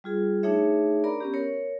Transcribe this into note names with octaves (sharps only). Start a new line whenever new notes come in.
G3 F4 G#4
A3 D4 D#4 G#4 C#5 E5
D4 A#4 D5 A#5 B5
B3 C#4 G4
A#4 C#5